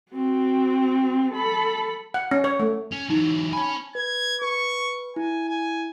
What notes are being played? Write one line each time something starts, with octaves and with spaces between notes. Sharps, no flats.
C4 F#4
A4 B5
F#5
C#4
C#5
A3
C#4
E3 F#3 D#4
C#5 G#5 A5 B5
B4 G#6
B4 C#6
E4 G#5
G#5